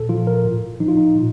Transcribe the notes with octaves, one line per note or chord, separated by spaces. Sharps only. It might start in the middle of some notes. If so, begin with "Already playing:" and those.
Already playing: A#2 A4
F3 F4
A#4
A2
F3 D#4
F4
D#4
A#2